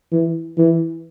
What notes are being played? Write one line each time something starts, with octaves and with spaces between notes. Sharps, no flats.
E3
E3